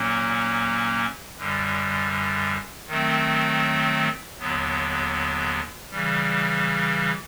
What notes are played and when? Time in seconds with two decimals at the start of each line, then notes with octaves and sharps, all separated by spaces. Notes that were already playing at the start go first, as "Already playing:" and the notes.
Already playing: A#2 F#3 A#3 C#4
1.36 F#2 D3 G3
2.87 D#3 F#3 A3 C4
4.39 D#2 D3 F#3 B3
5.90 C#3 E3 G3